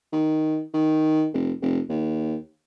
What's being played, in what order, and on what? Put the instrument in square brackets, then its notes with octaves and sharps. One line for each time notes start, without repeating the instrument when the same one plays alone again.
[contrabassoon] D#3
D#3
F1
F1
D#2